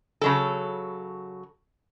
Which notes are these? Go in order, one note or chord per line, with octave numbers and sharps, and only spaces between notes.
C#3 F#3 A4